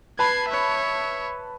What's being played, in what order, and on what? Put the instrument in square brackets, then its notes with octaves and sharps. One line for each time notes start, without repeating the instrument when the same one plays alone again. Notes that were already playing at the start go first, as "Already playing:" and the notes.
[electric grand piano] B4 A5 B5 [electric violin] G#6 C7
[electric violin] C#5 E5